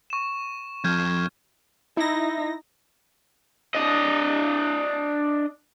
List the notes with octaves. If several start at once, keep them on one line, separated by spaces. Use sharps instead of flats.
C#6 E7
F2 F6 G6 G#6
D#4 E4 A#6
D4 D#5